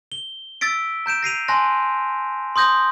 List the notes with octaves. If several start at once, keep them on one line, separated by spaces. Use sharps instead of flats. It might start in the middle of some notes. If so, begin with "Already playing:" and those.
G7
E6 A6 B6 D7
A#5 G6 D7 E7
A#6 C7 D#7 F7
G#5 A5 C6 F#6 A#6
C6 D#6 G6 A#6